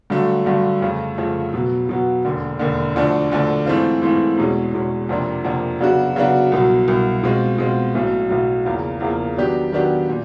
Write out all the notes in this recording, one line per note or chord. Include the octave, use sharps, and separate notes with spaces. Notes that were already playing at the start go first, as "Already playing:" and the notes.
G2 D3 F#3 A3
G2 D3 F#3 A3
F2 C#3 F3 A3
F2 C#3 F3 A3
B2 F#3 B3
B2 F#3 B3
E1 D#2 D3
E1 D#2 D3
D2 D3 F3 A3 D4
D2 D3 F3 A3 D4
G#2 E3 A3 C4 F4
G#2 E3 A3 C4 F4
E2 B2 G#3 C#4
E2 B2 G#3 C#4
F2 C3 F3 A#3 D4
F2 C3 F3 A#3 D4
C#3 F#3 B3 D4 F#4
C#3 F#3 B3 D4 F#4
C2 B2 F#3
C2 B2 F#3
B2 G#3 C4 F4
B2 G#3 C4 F4
B1 A2 F#3
B1 A2 F#3
E2 C#3 F3 A#3
E2 C#3 F3 A#3
D#3 F#3 B3 D4 G4
D#3 F#3 B3 D4 G4
A#2